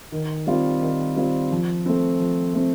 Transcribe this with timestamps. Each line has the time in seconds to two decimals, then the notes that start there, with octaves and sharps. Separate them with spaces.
0.12 D#3
0.47 G3 C4 F4
0.82 D#3
1.16 G3 C4 F4
1.52 F3
1.86 A3 C4
2.20 F3
2.54 A3 C4